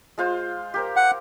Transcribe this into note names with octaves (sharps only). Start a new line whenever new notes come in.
G#3 F4 C5
G4 A#4 C5
F#5